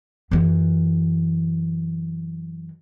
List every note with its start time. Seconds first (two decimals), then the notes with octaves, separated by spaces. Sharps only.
0.31 F#2 E3